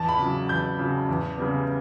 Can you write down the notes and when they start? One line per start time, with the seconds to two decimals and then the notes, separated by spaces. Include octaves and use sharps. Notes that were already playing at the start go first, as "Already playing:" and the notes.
Already playing: E2 A5
0.09 B5
0.18 C#3 F#3
0.49 E2 G6
0.79 C#3 F#3
1.09 E2
1.38 C#3 G3 B3